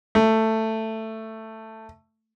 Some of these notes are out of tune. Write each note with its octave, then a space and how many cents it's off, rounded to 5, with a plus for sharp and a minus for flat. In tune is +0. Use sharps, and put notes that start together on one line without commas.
A3 +10